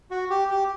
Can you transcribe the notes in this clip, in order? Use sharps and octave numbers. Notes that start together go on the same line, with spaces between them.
F#4
G4
G4